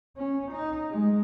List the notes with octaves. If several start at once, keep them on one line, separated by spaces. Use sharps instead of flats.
C#4
D#4
G#3